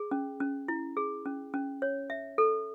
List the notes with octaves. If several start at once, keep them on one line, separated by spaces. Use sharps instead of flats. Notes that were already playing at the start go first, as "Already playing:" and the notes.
Already playing: G#4
C#4
C#4
E4
G#4
C#4
C#4
C#5
E5
A4